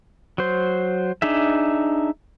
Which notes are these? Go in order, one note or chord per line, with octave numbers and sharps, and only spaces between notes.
F#3 C5
D4 D#4 G#4 E5